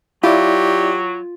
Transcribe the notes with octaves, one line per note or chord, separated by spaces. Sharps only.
F#3 E4 F4 G4 D5